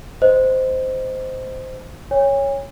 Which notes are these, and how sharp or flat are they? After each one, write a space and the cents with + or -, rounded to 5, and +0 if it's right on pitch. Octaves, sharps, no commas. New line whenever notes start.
C5 -15 D#5 +0
C#5 +0 G#5 -40